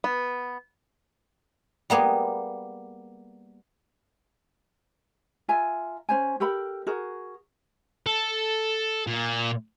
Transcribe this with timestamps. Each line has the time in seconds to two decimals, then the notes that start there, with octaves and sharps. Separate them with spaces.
0.04 B3
1.90 G3 A#3 B3 G#4
5.48 F4 E5 G#5 A#5
6.09 C#4 C5 G#5
6.40 G4 A4 A#4 B5
6.87 F#4 G#4 A#4
8.06 A4
9.07 A#2